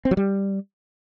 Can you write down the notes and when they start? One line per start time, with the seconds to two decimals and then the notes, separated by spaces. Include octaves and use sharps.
0.05 C4
0.11 F#3
0.17 G3